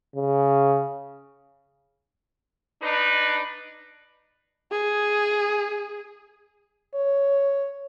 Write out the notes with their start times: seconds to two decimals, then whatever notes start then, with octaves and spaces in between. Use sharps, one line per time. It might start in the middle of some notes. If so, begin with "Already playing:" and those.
0.16 C#3
2.82 D4 D#4 B4
4.72 G#4
6.94 C#5